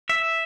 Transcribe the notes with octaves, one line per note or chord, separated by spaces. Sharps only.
E5